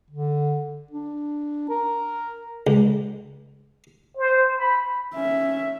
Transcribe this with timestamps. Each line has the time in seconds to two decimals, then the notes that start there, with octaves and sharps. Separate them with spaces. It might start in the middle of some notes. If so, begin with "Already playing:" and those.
0.10 D3
0.91 D4
1.70 A#4
2.67 C#2
4.17 C5
4.57 B5
5.15 C#4 E5